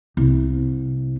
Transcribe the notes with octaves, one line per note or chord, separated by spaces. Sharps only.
C2 C3